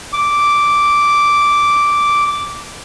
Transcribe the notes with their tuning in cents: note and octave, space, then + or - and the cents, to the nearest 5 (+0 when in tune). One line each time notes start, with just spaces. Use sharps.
D6 -5